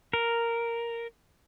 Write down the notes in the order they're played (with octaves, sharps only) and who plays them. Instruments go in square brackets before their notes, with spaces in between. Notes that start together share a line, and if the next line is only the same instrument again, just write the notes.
[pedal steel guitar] A#4